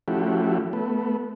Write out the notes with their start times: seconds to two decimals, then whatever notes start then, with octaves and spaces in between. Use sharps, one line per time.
0.08 F3 A3 C#4 E4 F#4 G4
0.73 A3 B3